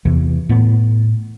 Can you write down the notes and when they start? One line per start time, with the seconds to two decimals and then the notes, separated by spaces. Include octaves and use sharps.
0.05 E2 C3 E3
0.49 A2 B3